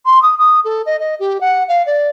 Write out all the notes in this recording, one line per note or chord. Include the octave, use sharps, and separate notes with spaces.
C6
D#6
D#6
A4
D#5
D#5
G4
F#5
F5
D5